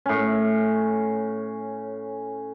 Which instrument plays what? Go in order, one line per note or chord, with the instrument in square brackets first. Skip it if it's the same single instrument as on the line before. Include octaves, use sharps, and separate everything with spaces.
[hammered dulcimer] A2 C#4